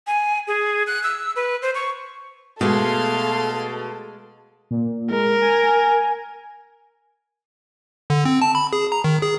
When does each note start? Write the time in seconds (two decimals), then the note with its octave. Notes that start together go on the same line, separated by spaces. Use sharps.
0.07 G#5
0.47 G#4
0.87 F#6
1.03 E6
1.36 B4
1.62 C5
1.75 C#6
2.61 B2 G#3 A3 G4 A4 F5 C6
4.71 A#2
5.11 G#3 A#4
5.42 G#5
8.10 D3
8.25 C4
8.42 A5
8.55 B5
8.73 G#4
8.92 A#5
9.04 D#3
9.22 G#4